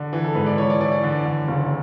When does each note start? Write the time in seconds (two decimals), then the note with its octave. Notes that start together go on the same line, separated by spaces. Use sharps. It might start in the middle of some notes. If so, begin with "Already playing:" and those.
Already playing: D3
0.13 E3
0.24 A4
0.35 G#2 B4
0.46 D5
0.58 E3 C#5
0.70 D5
0.80 E3 D5
0.92 D5
1.03 D3
1.26 D3
1.48 F#1